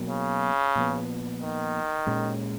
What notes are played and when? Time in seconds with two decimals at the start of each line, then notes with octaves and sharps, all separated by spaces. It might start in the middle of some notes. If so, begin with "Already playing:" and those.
Already playing: B2 F#3 A#3
0.10 C#3
0.76 A#2 F3 B3
1.41 D#3
2.07 A#2 G#3 C#4